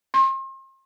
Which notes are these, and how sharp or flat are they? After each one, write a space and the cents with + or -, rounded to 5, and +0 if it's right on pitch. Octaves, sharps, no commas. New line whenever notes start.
C6 +40